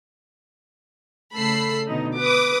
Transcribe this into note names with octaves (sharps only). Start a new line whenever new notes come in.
C#3 A3 A4 B5 E6 C7
B2 D3 D#4
B4 D6 D#6